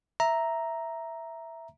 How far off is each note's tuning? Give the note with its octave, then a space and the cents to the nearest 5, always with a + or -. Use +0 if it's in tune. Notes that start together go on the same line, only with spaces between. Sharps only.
E5 +0 A#5 +0